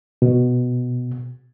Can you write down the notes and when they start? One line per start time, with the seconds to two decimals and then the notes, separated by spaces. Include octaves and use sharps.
0.22 B2